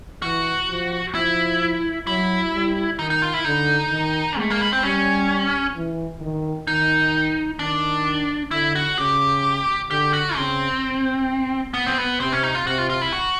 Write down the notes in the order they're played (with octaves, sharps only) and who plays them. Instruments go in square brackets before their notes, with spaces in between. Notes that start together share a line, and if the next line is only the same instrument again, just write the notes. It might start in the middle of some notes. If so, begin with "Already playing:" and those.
[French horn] E3 [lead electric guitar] F#4
[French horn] F3
[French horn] F3 [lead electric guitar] E4
[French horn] F#3 [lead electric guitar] E4
[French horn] G3
[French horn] D#3 [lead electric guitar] D#4
[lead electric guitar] D#4
F4
E4
[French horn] D3 [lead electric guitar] D#4
[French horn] D#3
[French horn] G#3 [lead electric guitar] A3
[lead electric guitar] A#3
B3
C4
[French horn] G3 [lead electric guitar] C#4
[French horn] E3
D#3
[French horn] D#3 [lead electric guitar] D#4
[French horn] D#3 [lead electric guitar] D4
[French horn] D3 [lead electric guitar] E4
[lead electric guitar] F#4
[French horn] C#3 [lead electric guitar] G4
[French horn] D3 [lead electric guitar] G4
[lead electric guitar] F#4
[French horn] C#3 [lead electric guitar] C4
[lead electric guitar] B3
C4
B3
[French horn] C3 [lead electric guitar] C4
[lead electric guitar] C#4
D#4
F4
[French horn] C3 [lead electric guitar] F#4
[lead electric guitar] F4
F4
E4
F#4